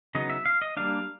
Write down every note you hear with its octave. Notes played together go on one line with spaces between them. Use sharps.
C#3 F#3 B3 D#4 D#5
E5
F5
D#5
G3 A#3 D4 F5